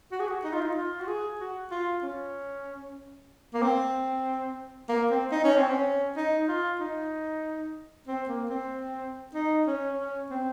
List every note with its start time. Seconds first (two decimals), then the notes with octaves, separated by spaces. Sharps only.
0.12 F#4
0.20 G#4
0.27 F#4
0.44 D#4
0.53 F4
0.61 D#4
0.76 F4
1.00 F#4
1.07 G#4
1.40 F#4
1.71 F4
2.03 C#4
3.54 A#3
3.62 C4
4.89 A#3
5.11 C4
5.32 D#4
5.44 C#4
5.57 C4
5.70 C#4
6.16 D#4
6.48 F4
6.80 D#4
8.07 C4
8.29 A#3
8.50 C4
9.34 D#4
9.67 C#4
9.98 C#4
10.30 C4